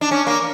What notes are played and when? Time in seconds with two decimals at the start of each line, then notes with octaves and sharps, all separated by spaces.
0.01 D4
0.11 C#4
0.27 A#3